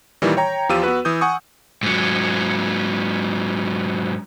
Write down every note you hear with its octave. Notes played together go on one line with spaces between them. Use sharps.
A#2 D#3 E3 G3
C#5 G5 A#5
E2 F3 F4 G4 E6 D#7
B3 F#4 B4
E3 D#6 G6
F#5 G#5 C#6 D#6
G#2 F#3